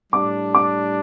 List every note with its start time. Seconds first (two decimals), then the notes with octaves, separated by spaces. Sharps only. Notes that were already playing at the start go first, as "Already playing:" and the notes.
0.12 A2 G3 D4 D6
0.55 D6